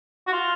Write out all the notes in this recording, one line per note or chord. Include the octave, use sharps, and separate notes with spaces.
F#4
F4